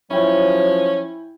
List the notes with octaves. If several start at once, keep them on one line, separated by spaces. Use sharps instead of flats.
F3 F#3 C#4 E4 G5 G#5